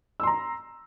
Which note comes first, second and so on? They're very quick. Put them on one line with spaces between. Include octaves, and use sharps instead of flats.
E6 C6 A#5